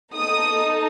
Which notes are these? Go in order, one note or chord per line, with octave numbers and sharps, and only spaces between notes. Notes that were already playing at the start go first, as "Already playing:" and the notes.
D#4 A4 D#6